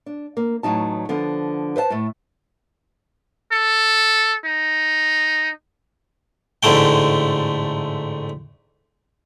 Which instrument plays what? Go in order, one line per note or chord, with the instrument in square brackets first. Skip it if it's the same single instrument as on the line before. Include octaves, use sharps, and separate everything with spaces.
[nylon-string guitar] D4
A#3
E2 A2 F#3 D#4 A5
D3 F3 B3
B4 C5 D#5 A5
A2 A3
[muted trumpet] A4
D#4
[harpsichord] A1 G#2 D3 A3 G5